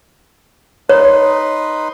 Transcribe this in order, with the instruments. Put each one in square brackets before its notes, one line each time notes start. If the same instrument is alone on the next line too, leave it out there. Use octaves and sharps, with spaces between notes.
[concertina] D#4 B4 C6 [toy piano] C#5